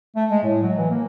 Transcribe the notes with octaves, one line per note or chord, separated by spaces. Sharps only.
A3
G#3
A2
F#3
E3
A#3